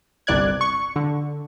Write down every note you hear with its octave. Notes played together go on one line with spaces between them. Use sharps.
G1 C2 D5 F#6 G#6
C#6
D3